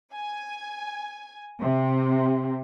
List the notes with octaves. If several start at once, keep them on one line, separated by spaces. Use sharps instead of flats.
G#5
C3